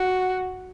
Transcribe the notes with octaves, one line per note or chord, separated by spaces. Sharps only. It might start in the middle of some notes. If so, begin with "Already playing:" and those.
Already playing: F#4